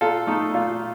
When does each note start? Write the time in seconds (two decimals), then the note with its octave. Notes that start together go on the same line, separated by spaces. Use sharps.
0.01 A#2 F4 A4
0.27 A3 D#4
0.54 A#2 F4